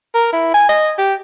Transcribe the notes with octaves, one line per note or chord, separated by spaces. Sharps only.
A#4
E4
G#5
D#5
G4